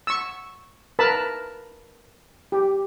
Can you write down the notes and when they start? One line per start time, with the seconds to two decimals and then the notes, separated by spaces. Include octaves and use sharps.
0.07 C#6 E6
0.99 A#4 B4 A5 B5
2.52 G4